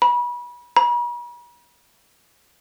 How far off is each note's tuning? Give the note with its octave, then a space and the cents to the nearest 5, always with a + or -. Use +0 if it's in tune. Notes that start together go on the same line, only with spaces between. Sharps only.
B5 -30
B5 -45